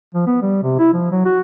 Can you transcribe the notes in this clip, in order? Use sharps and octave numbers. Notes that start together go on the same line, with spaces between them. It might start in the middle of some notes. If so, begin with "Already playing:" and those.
F3
B3
G3
C3
E4
F3
F#3
F#4